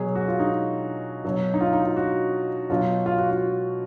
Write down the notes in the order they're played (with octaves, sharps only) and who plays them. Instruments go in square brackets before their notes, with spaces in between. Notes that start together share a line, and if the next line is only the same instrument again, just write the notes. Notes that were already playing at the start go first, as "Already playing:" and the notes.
Already playing: [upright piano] B2 F#3 G#4
F#4
F4
D#4
B2 F#3
D#4
F4
D#4
F4
F#4
B2 F#3 F4
F4
F#4
F4